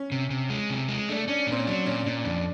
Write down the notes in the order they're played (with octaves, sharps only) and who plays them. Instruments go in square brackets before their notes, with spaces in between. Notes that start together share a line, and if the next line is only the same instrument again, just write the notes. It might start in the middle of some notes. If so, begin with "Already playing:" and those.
Already playing: [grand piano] C#4
[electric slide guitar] C3
C3
G#3
C3
G#3
[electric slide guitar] A3 [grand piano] D4
[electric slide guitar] C#4 [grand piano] D4
[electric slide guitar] A#2 [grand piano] C4
[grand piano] C#4
[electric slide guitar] F#3 [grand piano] D4
[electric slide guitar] A#2 [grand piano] C#4
[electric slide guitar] A#2 [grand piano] D4
[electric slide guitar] F2 [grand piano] D4